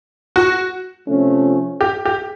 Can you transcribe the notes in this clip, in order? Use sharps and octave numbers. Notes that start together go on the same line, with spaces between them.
F#4
C3 F3 A3 C#4
G4
G4